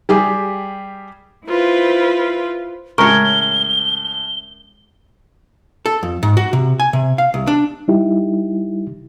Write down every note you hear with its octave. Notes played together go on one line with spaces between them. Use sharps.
G3 G4 G#4
E4 F4 B4 C5
A2 C#3 G#3 G#4 A#4 C#5 C#6 G7
A4
F2
G#2
F#4
C3
G#5
C3
F5
C2
D4
G3 D#4 E4 G4